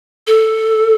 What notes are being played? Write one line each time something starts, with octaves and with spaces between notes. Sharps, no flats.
A4